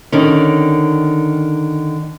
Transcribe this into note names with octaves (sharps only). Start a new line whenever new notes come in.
D3 D#3 C#4